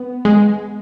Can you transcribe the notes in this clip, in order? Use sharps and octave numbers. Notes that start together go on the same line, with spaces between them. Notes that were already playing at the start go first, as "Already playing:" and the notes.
Already playing: B3
G#3